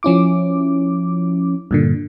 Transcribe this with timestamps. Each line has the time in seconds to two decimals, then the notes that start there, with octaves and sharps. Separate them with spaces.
0.03 F3 C#4 E4 D6
1.71 G2 A#2 D3